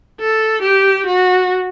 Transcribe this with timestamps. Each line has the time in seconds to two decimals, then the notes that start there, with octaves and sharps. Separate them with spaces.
0.20 A4
0.62 G4
1.06 F#4